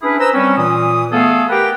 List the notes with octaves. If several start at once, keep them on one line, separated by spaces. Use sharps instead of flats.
C#4 D4 E4 G#4 B4
B4 C5 A#5 E6
G3 C4 C#4
A#2 E3 D#6
A3 B3 G#4 A4 F5
G4 A#4 B4 F#5 G5